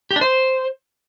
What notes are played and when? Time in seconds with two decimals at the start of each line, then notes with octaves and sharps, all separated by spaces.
0.11 G4
0.16 D4
0.21 C5